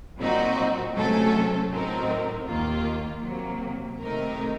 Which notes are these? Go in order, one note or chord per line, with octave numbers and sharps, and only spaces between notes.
A#2 F#3 C4 D#4 F#4
C3 F#3 A3 C#4 A4
A2 F#3 C4 D#4 A#4
D#2 D#3 A#3 F4
C3 F#3 A#3
C3 D#3 A3 D#4 A#4